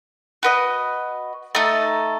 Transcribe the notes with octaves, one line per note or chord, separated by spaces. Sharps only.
F#4 B4 D#5
A3 D#4 A4